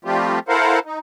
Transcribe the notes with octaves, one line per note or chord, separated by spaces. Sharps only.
F3 G3 A3 C4 F4 G4
E4 A4 A#4 C5 F5 F#5
D#4